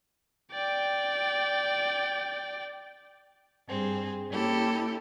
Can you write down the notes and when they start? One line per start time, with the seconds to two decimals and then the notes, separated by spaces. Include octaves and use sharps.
0.52 D5 G5
3.67 G2 C4 G#4
4.29 A#3 C#4 E4 G4 A4